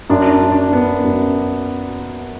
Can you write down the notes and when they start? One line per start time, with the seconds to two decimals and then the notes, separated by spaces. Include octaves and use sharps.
0.10 F#2 D4
0.30 D4
0.41 F#2
0.52 D4
0.72 F#2 B3
1.04 F#2